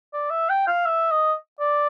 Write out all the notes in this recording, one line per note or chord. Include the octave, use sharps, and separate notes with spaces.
D5
E5
G5
F5
E5
D#5
D5